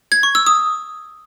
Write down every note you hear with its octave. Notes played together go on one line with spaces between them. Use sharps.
G#6
C#6
E6
D#6